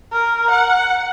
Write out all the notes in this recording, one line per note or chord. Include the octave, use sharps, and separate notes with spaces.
A#4
F#5